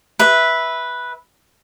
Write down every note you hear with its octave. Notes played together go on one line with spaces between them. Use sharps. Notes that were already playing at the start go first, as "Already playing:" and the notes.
B4 E5